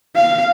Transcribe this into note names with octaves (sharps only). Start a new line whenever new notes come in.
F5